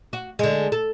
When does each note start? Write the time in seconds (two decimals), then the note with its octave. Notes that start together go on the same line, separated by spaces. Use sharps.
0.13 F#4
0.39 D3 G#3
0.72 A4